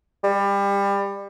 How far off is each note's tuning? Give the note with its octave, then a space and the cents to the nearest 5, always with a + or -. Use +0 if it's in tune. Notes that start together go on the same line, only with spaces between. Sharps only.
G3 +25